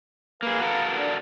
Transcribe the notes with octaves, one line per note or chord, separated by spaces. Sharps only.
A#3 G#4 B4 F5 A#5
F#4 A4 A#4
D4